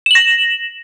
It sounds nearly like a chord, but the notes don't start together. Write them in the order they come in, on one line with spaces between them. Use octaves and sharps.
E7 F#7 A#6